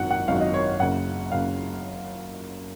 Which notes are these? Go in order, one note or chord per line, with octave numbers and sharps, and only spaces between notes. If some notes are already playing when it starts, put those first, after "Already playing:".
Already playing: G#1 F#2 D#3 F#3 F#5
F#5
G#1 F#2 D#3 F#3 F5
D#5
C#5
F#1 F#2 C#3 F#5
F#1 F#2 C#3 F5